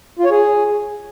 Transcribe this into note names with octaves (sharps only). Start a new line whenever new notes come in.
F4
C#5
G#4